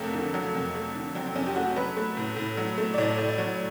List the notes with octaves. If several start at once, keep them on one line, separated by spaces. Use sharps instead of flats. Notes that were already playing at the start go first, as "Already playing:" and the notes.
Already playing: F2 D3 F#3 A3 A#3
D3
F#3
F2
A3
D3
F#3 C4
C4
F2 C#4
G4
A3 F#4
F#3 B4
A3
A2
A2
F#3
A3
D5
A2 C#5
A2
D5
F#3